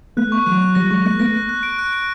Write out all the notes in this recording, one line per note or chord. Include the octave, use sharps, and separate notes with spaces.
A3 B3 F#6
C#6
E3 F#3 F#6
F#6
F3 G3 A#6
F#3 G#3 C#6
G#3 A#3 F#6
A3 B3 A#6
F#6
F#6
D7
F#6
D7